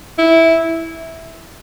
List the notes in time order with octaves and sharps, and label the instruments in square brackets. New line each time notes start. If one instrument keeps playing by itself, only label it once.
[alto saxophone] E4